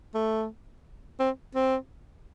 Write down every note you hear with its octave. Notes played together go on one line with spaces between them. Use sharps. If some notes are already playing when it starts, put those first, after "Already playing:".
A3
C4
C4